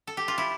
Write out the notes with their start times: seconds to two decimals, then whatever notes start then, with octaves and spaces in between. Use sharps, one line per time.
0.07 A4
0.17 G4
0.28 F4
0.38 E4